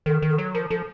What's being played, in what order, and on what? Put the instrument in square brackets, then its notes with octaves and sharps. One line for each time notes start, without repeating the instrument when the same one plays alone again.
[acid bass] D#3 [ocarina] A4
[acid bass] D#3
[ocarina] A4
[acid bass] F#3
[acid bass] F3 [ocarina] A#4
[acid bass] F3 [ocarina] A4